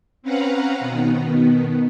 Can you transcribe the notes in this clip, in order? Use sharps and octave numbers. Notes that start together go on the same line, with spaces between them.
C4 C#4 B4 F5 F#5 A#5
B2 D#3 B3